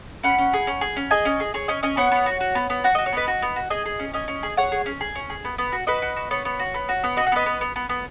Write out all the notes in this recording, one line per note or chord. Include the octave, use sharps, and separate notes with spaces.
C#4 F#5 B5
C#4
G#4
C#4
G#4
C#4
G#4 D#5 G#5
C#4
G#4
G#4 C#5
C#4 D#5 G#5
C#4 D#5 G#5
B3 C#5 F#5
B3
F#4
F#4
B3
B3
F#4 F#5
F#4 D#5
C#5
B3 B4 D#5
F#4
B3
F#4
G#4 D#5 G#5
G#4
C#4
C#4 D#5 G#5
C#4
G#4
G#4 C#5 F#5
G#4
C#4
G#4
C#4
G#4
B3
B3
F#4
F#4 B4 D#5
F#4
F#4
B3 C#5
B3
F#4
B3
F#4
B3
F#4 D#5
F#5
B3 B4 D#5
B3
B3
B3
B3